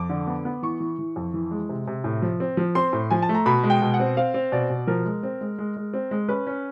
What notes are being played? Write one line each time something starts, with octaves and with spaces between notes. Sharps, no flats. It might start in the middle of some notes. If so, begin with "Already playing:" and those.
Already playing: F2 D6
D3
B3
B3
E3 C#6
E3
E3
F2
E3
G#3
C3
C3
A2
F3
C4
F3
C4 C6
A2
F3 G#5
A5
A3
A#5
B2 B5
G#3
G5
B2
F#5
C4
C4 F5
C4
B2 D5
B2
F3 A#4
G#3
C4
G#3
G#3
G#3
C4
G#3
C#4 B4
C#4